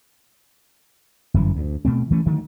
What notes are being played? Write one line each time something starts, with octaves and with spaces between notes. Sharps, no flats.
G1 F#2 E3
D2
B2 A3 C4
E3 A3 C#4
D3 D#3 F#3 A3